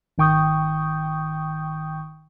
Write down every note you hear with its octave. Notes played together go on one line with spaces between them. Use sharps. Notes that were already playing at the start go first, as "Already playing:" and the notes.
G#1 D#3 G5 C#6 D#6 G6